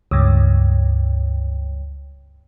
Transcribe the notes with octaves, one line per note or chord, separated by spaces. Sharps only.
C#2 G2